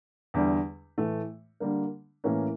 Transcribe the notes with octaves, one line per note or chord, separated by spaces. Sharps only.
E2 D3 G3
A2 E3 A3
D3 G3 A#3
A2 E3 A#3 C#4